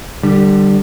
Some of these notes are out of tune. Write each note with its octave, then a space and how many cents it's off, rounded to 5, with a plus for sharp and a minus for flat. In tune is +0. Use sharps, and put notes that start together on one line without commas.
D3 +30 G3 +0